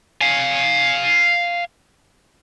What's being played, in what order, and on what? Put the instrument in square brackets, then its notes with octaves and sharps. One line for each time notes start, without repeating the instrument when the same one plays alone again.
[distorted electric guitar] F5 G#5